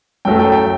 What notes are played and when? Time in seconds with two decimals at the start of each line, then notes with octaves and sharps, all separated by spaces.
0.25 F#2 F#3 A3 G5
0.39 G5
0.52 G5